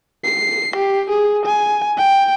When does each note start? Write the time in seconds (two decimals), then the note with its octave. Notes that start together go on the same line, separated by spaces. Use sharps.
0.24 C7
0.76 G4
1.10 G#4
1.45 G#5
1.97 G5